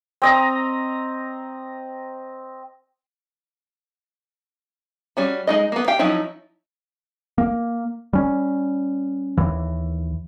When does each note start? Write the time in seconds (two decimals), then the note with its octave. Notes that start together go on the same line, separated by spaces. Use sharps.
0.22 C4 D#5 A#5
5.17 G3 C#4 F#4
5.47 G#3 D#4 D#5
5.72 A#3 B3
5.88 G4 F5 G5
5.99 F3 F#3 C#4 D#4 E4
7.38 A#3
8.13 G3 C#4
9.38 D#2 E3